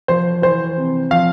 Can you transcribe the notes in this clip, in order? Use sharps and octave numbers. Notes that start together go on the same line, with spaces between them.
F3 C5
E3 C5
C3
F3 F5